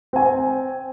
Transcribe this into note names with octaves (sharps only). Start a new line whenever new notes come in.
C4 G#5